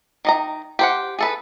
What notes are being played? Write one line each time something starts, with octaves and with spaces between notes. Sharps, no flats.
D#3 D#5 A#5
G4 C5 F#5
G#4 A4 B4